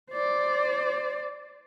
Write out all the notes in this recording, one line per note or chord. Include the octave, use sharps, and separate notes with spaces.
C5 D5